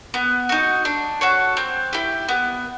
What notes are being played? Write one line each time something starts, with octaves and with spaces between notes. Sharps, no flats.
B3
D#4 F#4
D4
F#4 A4 C#5
C4
E4 G4
B3